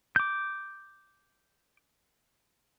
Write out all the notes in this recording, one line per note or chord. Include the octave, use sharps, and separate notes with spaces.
D6 G6